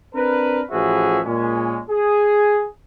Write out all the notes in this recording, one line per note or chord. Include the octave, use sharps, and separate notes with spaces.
C4 D4 A#4 B4
A1 F3 F#4 G#4 B4 E5
A#2 G#3 C#4
G#4